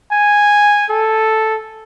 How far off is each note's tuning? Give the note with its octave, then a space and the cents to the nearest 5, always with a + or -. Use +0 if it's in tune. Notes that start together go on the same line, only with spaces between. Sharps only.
G#5 -10
A4 +0